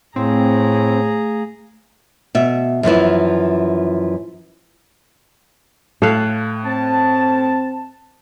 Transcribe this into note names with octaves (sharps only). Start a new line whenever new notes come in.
A2 A3 C4 G#4 F5 A#5
B2 E5
F#2 E3 F3 E4
A2 A4 F5 F#6
C4 A5